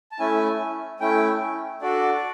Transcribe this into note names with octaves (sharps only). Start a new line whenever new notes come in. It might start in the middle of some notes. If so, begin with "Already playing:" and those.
A5
A3 C#4 E4 G#5
A3 C#4 E4 G5
D4 F#4 A4 D5